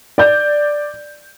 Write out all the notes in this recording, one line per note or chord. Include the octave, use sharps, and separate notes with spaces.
D5 G6